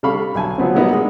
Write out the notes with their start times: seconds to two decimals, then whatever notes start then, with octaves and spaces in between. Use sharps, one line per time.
0.03 C3 G3 A4 F5 B5 C#6
0.35 B1 G#5 A5
0.58 F3 F#3 B3 C4
0.75 F#3 G3 A#3 B3 D4 D#4
0.93 G#3 D4